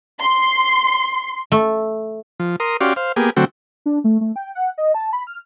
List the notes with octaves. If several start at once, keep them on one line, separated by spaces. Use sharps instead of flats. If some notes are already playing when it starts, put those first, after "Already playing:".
C6
A3
F3
A#4 C6 D#6
C#4 F#4 G4 D5 F5 C6
C5 F5
A#3 B3 G4 G#4
D3 F#3 A3 C4 F#4 G5
D4
A3
A3
G5
F#5
D#5
A5
B5
F6